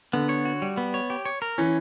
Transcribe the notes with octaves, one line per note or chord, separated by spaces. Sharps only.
D3 B3
C#5
F#4
G3
B3
C#5
G4
C#5
A#4
E3 C#4